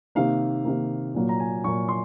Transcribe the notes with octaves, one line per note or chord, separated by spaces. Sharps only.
C3 D#3 A#3 F5
C3 D#3 A#3
A#2 F#3 A#3
A#5
G#5
A#2 F#3 A#3 C#6
C6